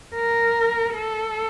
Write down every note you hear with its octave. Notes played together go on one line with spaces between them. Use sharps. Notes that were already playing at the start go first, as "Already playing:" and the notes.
A#4
A4